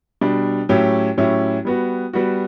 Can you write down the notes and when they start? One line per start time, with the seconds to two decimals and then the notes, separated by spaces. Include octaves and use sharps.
0.21 B2 G3 D4
0.69 A2 F#3 C#4 E4 G4
1.17 A2 F#3 C#4 E4 G4
1.65 G3 B3 F#4
2.13 G3 B3 F#4